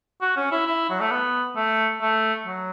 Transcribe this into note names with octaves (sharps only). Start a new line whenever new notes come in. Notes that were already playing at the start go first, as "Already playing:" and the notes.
F#4
C#4
E4
E4
F#3
A3
B3
A3
A3
F#3